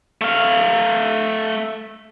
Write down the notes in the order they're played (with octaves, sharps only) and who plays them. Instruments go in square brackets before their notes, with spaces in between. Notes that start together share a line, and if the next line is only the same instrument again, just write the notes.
[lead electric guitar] A3 F5